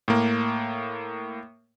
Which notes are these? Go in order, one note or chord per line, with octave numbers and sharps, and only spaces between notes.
A2 A#3